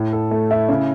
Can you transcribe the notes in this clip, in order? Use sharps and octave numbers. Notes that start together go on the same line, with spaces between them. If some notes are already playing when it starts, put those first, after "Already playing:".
Already playing: A2
A4
A3
E4
C#3